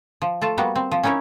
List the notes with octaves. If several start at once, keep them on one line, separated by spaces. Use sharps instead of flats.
F3
A3 F4 A5
G3 A#3 B3 F#4
C4
F3
C#4 D#4 E4 A#4 C#5